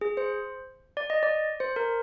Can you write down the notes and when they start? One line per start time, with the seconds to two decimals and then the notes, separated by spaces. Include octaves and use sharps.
0.01 G#4
0.17 C5
0.97 D5
1.10 D#5
1.23 D5
1.60 C5
1.76 A#4